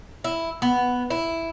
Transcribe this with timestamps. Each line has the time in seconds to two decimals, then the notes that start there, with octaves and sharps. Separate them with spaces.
0.24 E4
0.62 B3
1.10 E4